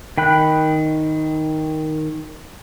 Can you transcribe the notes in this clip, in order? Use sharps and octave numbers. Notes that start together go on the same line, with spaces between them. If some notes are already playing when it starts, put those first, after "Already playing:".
D#3 G5 B5 F#6